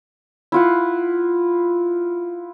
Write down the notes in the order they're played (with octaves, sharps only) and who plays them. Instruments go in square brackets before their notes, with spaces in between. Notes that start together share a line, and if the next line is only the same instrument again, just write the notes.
[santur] E4 F4 F#5